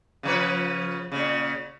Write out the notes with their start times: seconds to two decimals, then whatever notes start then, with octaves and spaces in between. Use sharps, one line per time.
0.23 C#3 F3 B4
1.12 A#2 C#3